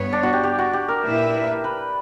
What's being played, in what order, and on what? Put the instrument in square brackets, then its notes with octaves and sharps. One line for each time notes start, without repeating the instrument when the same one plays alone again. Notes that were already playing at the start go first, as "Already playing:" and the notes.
Already playing: [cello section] G2 B3 C#5
[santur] D4
F#4
G4
G4
F#4
G4
A#4
[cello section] A#2 A#3 E4 B4 E5
[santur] B4